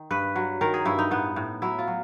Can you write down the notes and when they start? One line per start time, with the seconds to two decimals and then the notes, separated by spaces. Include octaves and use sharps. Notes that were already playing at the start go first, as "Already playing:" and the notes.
Already playing: D#3
0.11 G2 B4
0.36 F#3
0.61 D#3 A#4
0.74 G#4
0.85 G2 E4
0.99 D#4
1.11 A2 B3
1.36 A2
1.62 F#3 E4
1.79 F4
1.87 F#3